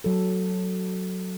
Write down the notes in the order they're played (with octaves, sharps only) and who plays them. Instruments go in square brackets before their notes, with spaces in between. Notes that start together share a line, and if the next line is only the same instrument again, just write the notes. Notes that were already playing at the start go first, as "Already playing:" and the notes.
[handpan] F#3 A4